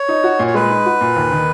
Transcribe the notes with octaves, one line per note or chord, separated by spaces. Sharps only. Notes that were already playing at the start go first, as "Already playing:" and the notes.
Already playing: C#5
D#4
F#4
A#2
C#5
G#3 B4
D#4
F#4
A#2
D#2
D#3